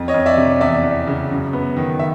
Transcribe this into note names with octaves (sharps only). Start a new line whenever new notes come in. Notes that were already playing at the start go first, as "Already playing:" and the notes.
Already playing: F2
C#5 D#5
F2
D5 E5
C3
E2 D5 E5
E2
C#3
F#2
B3
D#3
E5